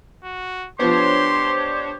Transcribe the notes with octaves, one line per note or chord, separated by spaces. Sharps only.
F#4
F3 B3 D4 G4 C5 C#5 C6